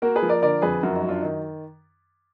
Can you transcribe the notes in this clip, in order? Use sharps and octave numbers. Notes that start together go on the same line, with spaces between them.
A#3 F#4 A#4
G#4 B4
F3
A#4 D5
D3 A#4 D5
F2 G#4 B4
F#2 F#4 A#4
D#4 F#4
F#3
D4 F4
D#3 D#4